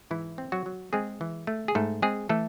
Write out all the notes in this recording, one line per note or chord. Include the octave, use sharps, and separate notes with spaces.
G#2 E3 E4
C4
F#3 F#4
F#3
G#3 C4 G#4
E3
A3
G#4
G#2 A3 A4
G#3 C4 G#4
E3 A3 A4